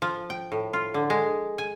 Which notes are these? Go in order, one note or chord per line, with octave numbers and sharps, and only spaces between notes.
F3
G5
A2
F4
D3
G#3
G#5